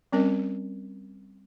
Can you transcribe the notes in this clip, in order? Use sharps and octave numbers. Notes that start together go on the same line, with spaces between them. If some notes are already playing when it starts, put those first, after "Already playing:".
G3 C4 C#4 A#4 D#5